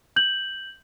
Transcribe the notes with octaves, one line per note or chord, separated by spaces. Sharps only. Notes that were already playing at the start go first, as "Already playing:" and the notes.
G6 F#7